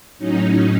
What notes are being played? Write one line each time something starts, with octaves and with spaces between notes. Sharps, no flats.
A2 F#3 C#4 D#4